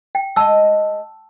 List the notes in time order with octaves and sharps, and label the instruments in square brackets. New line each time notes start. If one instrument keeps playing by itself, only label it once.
[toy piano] G5
[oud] G#3 D#5 [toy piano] A5 E6